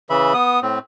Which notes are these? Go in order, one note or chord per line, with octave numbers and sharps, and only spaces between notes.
C#3 E3 E5 B5
B3 D#6
A2 C4